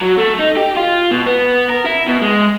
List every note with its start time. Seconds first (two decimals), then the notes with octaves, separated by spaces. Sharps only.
0.02 F#3
0.18 A3
0.39 D#4
0.57 G4
0.77 F4
1.11 B2
1.27 B3
1.70 A#4
1.85 E4
2.07 B2
2.22 G#3